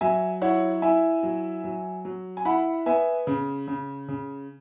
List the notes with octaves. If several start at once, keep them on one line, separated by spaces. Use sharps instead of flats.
F#3 E5 G#5
E4 C#5 F#5
E4 E5 G#5
F#3
F#3
F#3
G#5
E4 F#5 B5
B3 E5 G#5
C#3
C#3
C#3